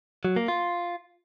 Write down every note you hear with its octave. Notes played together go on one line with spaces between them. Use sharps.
F#3
A#3
F4